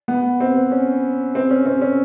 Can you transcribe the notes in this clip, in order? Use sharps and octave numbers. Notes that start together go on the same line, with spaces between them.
B3
C4
C#4
C4
C#4
C4
C#4